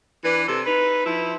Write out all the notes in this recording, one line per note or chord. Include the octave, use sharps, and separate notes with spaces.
E3 D4 B4
C3 A4
D#4 B4
F3 E4